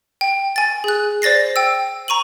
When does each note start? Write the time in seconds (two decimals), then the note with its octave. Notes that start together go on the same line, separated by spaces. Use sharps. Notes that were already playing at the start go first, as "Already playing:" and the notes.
0.21 G5
0.56 G#5 A6
0.84 G#4 F#6
1.22 C5 D5 A6 A#6 C7
1.56 G5 E6
2.08 A#5 C#6 D#7 F#7